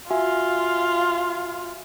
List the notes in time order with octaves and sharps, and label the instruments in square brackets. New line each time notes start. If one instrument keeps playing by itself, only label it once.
[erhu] F4 [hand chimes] F#4 E5 G#5